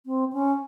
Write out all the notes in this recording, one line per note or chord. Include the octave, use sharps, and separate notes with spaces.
C4
C#4